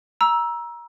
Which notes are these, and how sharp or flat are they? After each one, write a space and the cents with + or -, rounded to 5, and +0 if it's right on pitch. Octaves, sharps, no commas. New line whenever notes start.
A#5 +25 E6 +0